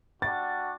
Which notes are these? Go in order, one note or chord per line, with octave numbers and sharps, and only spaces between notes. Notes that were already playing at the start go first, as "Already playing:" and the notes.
G3 D4 F#4 A6